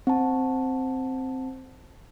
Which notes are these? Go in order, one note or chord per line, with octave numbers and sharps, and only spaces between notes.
C4 A5